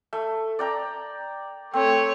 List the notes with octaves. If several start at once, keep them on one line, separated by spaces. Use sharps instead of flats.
A3
D5 G5 A#5
A3 C4 C#5